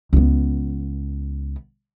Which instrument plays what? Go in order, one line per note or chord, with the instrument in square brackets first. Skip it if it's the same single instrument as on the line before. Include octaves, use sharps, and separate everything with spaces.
[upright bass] C#2 B3